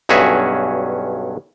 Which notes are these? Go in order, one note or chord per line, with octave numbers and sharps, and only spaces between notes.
B1 G2 C#4 F#4 G#4 E5